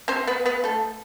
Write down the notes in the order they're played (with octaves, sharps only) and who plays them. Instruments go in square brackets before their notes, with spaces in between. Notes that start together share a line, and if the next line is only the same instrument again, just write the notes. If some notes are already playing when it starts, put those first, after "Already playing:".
[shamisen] C4 C5
B3 B4
B3 B4
A3 A4